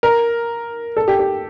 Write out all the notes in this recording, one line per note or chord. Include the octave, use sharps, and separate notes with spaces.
A#4
A4
G4
G4